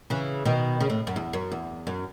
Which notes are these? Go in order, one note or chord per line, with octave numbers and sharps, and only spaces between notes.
C#3 E3
B2 D#3
C#3
A2
F#2
E2
F#2
E2
F#2